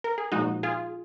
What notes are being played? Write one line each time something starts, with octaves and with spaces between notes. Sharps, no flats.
A#4
G#4
A#2 F3 G#3 D#4 F#4
F4 G#4